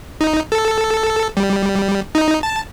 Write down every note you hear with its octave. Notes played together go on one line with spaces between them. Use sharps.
D#4
A4
G3
D#4
A5